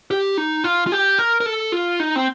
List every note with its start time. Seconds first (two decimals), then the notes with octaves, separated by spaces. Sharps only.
0.11 G4
0.37 D#4
0.64 F4
0.87 F4
0.92 G4
1.19 A#4
1.40 A#4
1.46 A4
1.72 F4
2.00 D#4
2.16 C4